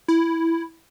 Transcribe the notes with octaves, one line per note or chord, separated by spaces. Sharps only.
E4